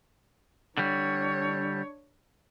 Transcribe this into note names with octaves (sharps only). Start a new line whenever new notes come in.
D3 G3 D4 C#5